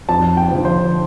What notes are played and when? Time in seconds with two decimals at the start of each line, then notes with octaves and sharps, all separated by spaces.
0.09 F2 A5
0.37 G5
0.51 D3 F3
0.65 C5